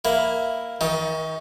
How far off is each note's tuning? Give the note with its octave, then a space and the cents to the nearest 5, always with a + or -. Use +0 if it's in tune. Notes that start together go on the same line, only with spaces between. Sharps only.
A#3 +0 E4 +0
D#3 +40 D#4 +20